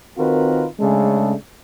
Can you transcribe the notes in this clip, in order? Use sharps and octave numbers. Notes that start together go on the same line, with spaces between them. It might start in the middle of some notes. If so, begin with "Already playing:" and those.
D#3 C4 F4 F#4 A#4 B4
C#3 G#3 A3 C#4 D4 A4